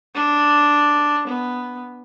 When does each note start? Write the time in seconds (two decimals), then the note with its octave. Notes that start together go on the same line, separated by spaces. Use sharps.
0.15 D4
1.27 B3